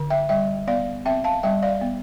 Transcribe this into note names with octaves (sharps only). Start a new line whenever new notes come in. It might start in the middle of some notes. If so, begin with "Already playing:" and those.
Already playing: D3
E5 G5
G3 E5 G5
B3 D5 F5
C4 E5 G5
F5 A5
G3 E5 G5
D5 F5
B3